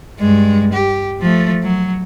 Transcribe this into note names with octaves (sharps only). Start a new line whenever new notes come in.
G2 G#3
G4
F3 A3
F#3